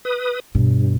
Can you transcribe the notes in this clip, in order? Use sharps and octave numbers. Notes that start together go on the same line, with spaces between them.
B4 D#6
G2 B2